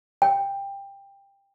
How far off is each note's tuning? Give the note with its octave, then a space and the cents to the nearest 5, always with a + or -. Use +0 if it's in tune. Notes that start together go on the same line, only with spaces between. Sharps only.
G5 +15